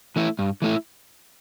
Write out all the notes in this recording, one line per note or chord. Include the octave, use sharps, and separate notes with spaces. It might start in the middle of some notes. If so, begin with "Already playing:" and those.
E3 A3 E4
G2
E3 A3 E4